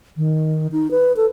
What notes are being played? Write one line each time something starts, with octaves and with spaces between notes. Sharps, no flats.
D#3
D#4
B4
A4